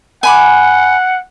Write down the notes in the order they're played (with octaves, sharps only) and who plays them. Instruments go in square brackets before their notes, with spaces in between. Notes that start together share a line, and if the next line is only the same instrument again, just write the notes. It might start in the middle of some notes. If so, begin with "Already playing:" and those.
[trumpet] F#5 [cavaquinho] G#5 B5 D6